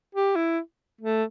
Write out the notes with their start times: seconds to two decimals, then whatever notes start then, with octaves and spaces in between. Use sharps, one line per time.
0.15 G4
0.36 E4
1.01 A3